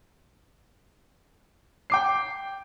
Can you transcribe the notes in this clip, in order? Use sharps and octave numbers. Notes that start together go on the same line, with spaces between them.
G5 D6 C7